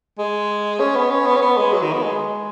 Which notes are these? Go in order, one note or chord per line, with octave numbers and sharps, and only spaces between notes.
G#3
C#4
B3
C#4
B3
C#4
B3
G#3
F#3
D#3
B3
G#3